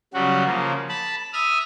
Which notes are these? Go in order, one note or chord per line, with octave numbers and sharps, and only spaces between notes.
C#3 F#3 G3 F#4
C#3 F3 A#3
A5 B5
E5 D#6 F6